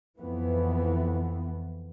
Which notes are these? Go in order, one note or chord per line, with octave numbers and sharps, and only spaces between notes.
F2 E3 B3